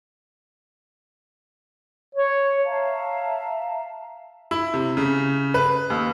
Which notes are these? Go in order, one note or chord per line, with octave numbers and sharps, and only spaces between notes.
C#5
E5 F5 A5 A#5
E4
C3
C#3
B4
D#2